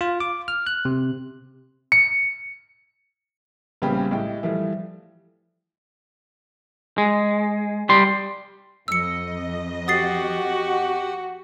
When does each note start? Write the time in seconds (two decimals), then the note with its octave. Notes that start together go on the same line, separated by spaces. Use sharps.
0.01 F4
0.20 D6
0.48 F6
0.67 F#6
0.85 C3
1.92 C#7
3.82 A#1 C#3 G3 B3 G4 B5
4.11 A2 G#3 G4 G5
4.43 E3 F3 G3 A3
6.98 G#3
7.89 G3 C6
8.88 F2 D#5 E6 C#7
9.88 F#4 G4 F#5 D#6 A6 C7